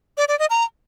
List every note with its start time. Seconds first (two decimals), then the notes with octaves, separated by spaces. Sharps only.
0.17 D5
0.28 D5
0.39 D#5
0.50 A#5